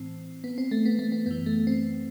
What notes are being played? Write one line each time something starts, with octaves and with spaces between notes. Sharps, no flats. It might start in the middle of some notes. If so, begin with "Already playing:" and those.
Already playing: A2 E3 C4
B3
C4
A3
B3
A3
B3
F#2 E3 B3
A3
C4